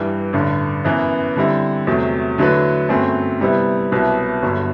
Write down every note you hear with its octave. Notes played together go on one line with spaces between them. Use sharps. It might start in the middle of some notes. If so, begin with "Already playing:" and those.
Already playing: G2 E3 G3
A1 G2 D3
F#2 E3 B3 E4
D3 G3 C4 E4
E2 C3 F#3 A3
D3 F#3 A3 E4 B4
G1 F#2 F#3 A3 C4
C3 G3 B3 E4
C2 B2 F#3 B3 E4
G1 G2 D3 F#3